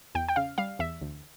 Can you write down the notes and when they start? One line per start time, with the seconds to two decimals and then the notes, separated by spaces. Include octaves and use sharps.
0.15 E2 G5
0.28 G5
0.36 C#3 F5
0.58 G3 F5
0.79 E2 E5
1.02 D2